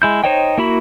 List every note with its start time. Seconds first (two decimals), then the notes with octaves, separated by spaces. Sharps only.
0.02 G#3 E4 G6
0.24 D#4 C5 C#5 D#5 G5
0.58 A#3 E4 F#4 B5